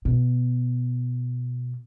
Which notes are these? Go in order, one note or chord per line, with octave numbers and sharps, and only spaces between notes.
B2